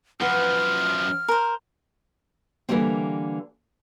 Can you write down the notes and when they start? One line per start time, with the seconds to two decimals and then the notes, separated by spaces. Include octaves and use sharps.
0.21 F#2 F3 B4 F#5 F6
1.28 A#4 C5
2.69 D3 E3 F#3 G3 A#3 C4